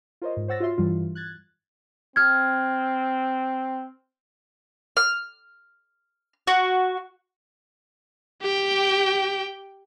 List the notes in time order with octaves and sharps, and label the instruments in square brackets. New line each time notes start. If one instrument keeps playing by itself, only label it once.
[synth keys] F4 A#4 C5 C#5 D#5
G#2
C5 C#5 F#5 E6 A6 A#6
F4 F#4 C#5 E5 C6
G2 E3 G3 F4
F#6 G#6 A6
[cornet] C4 [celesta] F6 G#6
[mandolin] F6
F#4
[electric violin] G4 G5